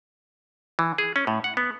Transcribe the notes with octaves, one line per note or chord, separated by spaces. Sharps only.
E3
G#4
C#4
A2
F#5
B3